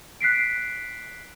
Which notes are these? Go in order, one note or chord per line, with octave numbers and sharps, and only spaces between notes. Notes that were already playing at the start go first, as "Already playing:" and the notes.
F#6 B6 C7 D7